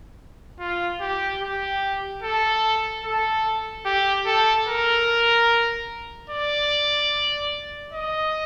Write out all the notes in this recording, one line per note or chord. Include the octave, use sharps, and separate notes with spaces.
F4
G4
G4
A4
A4
G4
A4
A#4
D5
D#5